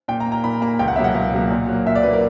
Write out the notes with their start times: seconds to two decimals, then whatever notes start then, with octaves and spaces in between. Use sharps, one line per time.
0.08 A#2 G5
0.20 A#5
0.26 A#3
0.32 A#5
0.44 A#2 B5
0.62 A#3 A#5
0.79 C#2 G5
0.88 F#5
0.96 B2 F#3 A#3 E5
1.04 F#5
1.14 C#2
1.33 B2 F#3 A#3
1.51 A#2
1.68 F#3 A#3
1.86 A#2 E5
1.95 D5
2.03 F#3 A#3 B4
2.13 A#4